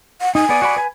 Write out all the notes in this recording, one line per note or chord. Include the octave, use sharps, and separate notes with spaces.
F#5
D#4 G#5
B3 D5
F#4 D5 B5
B4 G#5